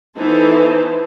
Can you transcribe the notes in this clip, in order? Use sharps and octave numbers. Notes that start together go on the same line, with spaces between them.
E3 B3 D#4 A4 C5